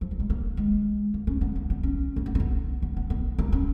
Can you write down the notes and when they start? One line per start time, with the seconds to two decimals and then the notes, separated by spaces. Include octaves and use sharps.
0.01 F3
0.11 F#3
0.20 G#3
0.30 A#3
0.57 G#3
1.14 A#3
1.27 C#4
1.41 B3
1.55 A#3
1.70 B3
1.83 C#4
2.16 A#3
2.26 B3
2.35 C#4
2.40 B3
2.82 B3
2.97 B3
3.10 B3
3.39 A#3
3.52 C#4